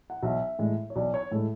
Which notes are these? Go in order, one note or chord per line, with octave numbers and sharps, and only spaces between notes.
F#5
B1 E5
A2 G#3
C#5
B1 D5
C#5
A2 G#3 A4